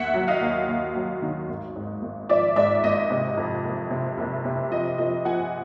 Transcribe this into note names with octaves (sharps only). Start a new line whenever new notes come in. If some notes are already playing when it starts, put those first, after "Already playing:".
Already playing: D#2 E5 F#5
F#3
D#5 F5
D#2
D#2
F#3
D#3
G#1
G#2
G#1
F3 D5 E5
G#2 D5 E5
G#1 D#5
C3
F2
F#1
C3
F#1
C3
F3 D#5
F3 D#5
F3 F#5 G#5